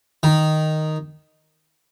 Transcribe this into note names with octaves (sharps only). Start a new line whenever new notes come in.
D#3